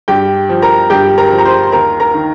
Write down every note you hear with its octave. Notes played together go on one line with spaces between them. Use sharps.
G2 G4 G5
F3
A#4 A#5
G2 G4 G5
A#4 A#5
F3
A#5
C5 C6
C6
D#2 A#4 A#5
A#4 A#5
D#3